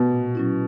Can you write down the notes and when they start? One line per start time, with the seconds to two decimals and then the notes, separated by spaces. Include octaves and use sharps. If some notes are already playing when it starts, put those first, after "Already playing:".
Already playing: B2
0.12 A#2
0.35 F#3 C#4 E4